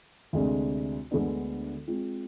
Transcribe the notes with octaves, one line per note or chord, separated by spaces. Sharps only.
D2 C3 G#3 D4
D2 D3 G#3 B3 D4
G#3 C4 F4